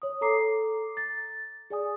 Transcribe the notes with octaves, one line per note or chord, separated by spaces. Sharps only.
C#5 D#6
A4 A#5 D6 C7
A6
G#4 D5 G#5 D#6